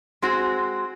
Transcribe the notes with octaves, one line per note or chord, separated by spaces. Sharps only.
G#3 C4 F#4